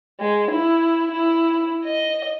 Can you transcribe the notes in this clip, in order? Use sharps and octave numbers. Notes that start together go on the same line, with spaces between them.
G#3
E4
E4
D#5